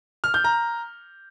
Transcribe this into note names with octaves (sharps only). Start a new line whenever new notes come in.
F6
G6
A#5